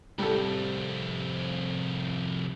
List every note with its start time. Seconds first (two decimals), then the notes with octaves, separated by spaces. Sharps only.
0.18 C2 F2 G3 A4